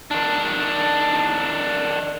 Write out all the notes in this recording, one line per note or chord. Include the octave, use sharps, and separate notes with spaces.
D#3 D4